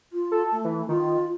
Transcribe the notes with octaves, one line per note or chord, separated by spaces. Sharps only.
F4
A4
A3
E3
D#3 F4